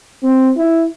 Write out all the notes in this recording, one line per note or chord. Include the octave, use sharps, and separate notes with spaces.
C4
E4